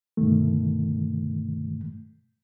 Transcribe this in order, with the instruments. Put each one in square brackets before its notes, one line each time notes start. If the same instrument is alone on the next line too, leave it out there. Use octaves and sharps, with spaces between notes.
[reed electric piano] G2 B2 D3 D#3 A3